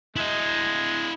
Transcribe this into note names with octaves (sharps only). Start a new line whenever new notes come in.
G#3 E4 D#5